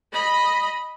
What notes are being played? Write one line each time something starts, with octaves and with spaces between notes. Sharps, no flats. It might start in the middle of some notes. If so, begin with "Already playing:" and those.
D#5 B5